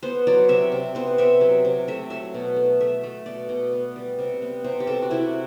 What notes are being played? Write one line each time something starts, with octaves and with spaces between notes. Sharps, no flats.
B3 C5
F#3 D5
C3 E5
C3
B3 C5
C3 E5
F#3
C3
A3 E5
F#3 E5
B2
A3
A3 E5
A3
B2 D5
B2
B3
G3
C3
B3
C3 C5
G4
C3 A4
F#4
C3 E4